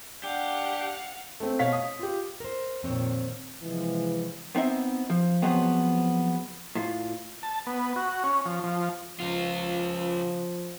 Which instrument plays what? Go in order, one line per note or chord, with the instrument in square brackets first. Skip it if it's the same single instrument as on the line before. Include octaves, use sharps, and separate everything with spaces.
[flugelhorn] D4 [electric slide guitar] G4 [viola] F5 F#5
[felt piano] A3 C4
B2 C#5 F5 B6
D#6
F4 G4
[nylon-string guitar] A#4 C5
[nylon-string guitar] F2 C4 C#5 [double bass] A#2 D#3
[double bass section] C3 F3 G#3 [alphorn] E3
[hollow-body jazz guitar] B3 C4 D#4 E5
F3
C#3 F3 F#3 G#3 B3 C4
A2 F4
[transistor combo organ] A5
B3
F#4
C#4
F3
F3
[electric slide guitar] C#3 F4 [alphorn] F3